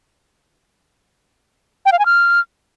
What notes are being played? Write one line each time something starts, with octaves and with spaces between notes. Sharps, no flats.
G5
F5
G#5
F6